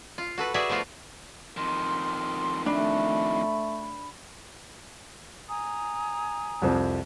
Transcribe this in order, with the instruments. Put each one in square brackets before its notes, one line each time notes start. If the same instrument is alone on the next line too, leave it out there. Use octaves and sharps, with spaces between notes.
[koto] F4
F#4 A4 B4
F#4 G#4 B4 D5 E5 A5
F3 A3 B3 F4 F#4
[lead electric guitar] F2 D#3 [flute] C6
[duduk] A3 [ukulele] D4 [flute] B5
[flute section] G#5 A#5 D#6
[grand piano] C2 F2 F3